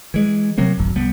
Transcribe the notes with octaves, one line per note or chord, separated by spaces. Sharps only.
E3 G#3
C3 F#3 A#3 C4
D1 G#1 F#2
C2 G3 B3